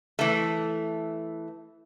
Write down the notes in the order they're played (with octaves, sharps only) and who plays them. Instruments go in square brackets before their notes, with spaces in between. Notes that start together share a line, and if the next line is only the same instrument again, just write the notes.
[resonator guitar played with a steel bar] E3 A3